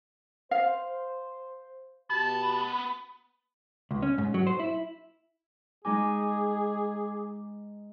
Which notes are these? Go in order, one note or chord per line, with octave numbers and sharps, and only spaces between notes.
C5 F5
B2 B3 F#4 G4 A5 B5
C#2
C#4
G#2
F#3
C5
E4
G#3 D#4 G#4 G#5 D6